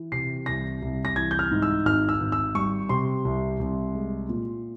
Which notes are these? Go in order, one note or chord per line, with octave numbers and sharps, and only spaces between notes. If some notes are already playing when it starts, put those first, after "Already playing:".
Already playing: E3
C3 C7
C2 A#6
C2
A#6
E3 G#6
G6
F6
G#2
E6
G#1 F6
E6
G#1
E6
G3 C#6
C3 C6
C2
C2
G#3
A#2